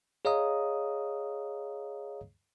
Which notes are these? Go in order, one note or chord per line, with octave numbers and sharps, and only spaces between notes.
G#4 C#5 D#5 F5 A#5 D#6